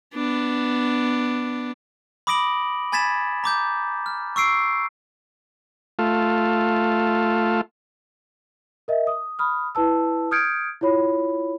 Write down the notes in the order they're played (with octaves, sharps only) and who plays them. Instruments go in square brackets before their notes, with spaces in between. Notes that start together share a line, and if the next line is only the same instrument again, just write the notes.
[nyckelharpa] B3 D4
[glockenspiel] B5 D6 D#6 A#6 D7 F#7
G#5 B5 G#6 A6 B6 E7
A#5 D6 G6
F6
C#6 E6 C7 D7
[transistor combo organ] A3 F4
[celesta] A#4 D#5 E5
D#6
B5 D#6 F6
E4 B4 A5 E6
D#6 F6 G6 G#6 C#7 D7
E4 F4 C#5 B5